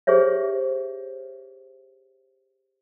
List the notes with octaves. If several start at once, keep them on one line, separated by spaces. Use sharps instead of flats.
G4 G#4 C5 C#5 E5